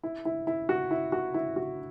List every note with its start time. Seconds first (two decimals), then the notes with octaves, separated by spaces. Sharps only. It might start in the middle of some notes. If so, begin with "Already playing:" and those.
0.03 E4
0.25 E4
0.47 E4
0.69 F#4
0.91 E4
1.12 F#4
1.34 E4
1.56 F#4